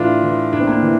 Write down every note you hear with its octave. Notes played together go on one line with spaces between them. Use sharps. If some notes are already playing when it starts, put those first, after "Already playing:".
Already playing: A2 E3 D4 F4
E3
A2 D4
C4
A#3 D4
E3